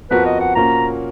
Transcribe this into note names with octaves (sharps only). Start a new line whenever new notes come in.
F2 F3 B3 F#4 A#4 B4
D#5
F#5
A#2 F3 A#3 C#4 F#4 A#5